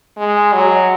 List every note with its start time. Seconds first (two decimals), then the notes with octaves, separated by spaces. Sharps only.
0.17 G#3
0.53 F#3